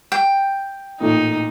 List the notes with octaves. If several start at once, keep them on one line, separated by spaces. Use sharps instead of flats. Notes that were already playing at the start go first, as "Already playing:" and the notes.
G5
A1 A#2 A3 D#4